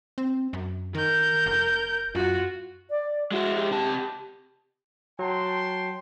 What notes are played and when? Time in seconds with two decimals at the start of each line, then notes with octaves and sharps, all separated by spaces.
0.18 C4
0.53 F#2
0.95 D#3 A#4 G6
1.46 F1
2.15 F#2 F4 F#4
2.90 D5
3.31 G#3 E4 F#4
3.55 G4
3.71 C3 A5
5.19 F#3 G5 A5 C6